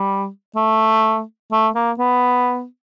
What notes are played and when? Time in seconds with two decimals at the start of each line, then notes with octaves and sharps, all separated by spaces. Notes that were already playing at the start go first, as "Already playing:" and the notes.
Already playing: G3
0.56 A3
1.52 A3
1.75 A#3
1.99 B3